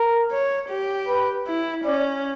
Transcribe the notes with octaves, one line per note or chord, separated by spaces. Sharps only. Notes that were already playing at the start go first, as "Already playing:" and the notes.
Already playing: A#4
C#5
G4
B4
E4
C#4 D5